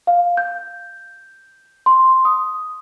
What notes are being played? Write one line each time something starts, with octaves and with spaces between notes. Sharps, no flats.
F5
G6
C6
D#6